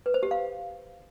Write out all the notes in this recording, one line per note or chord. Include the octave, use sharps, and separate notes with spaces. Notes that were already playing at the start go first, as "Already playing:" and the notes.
B4
C5
G4
F5